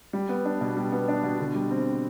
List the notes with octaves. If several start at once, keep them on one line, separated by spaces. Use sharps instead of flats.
G3
B3
D4
B2
G3
B3
D4
B2
D3
G3
C4